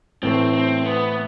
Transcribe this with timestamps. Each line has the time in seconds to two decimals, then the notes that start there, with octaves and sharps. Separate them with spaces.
0.23 A2 E3 A3 C4
0.54 C4
0.85 B3